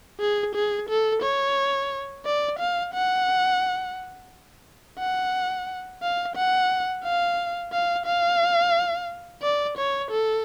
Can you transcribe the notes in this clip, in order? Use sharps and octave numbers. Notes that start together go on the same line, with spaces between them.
G#4
G#4
A4
C#5
D5
F5
F#5
F#5
F5
F#5
F5
F5
F5
D5
C#5
A4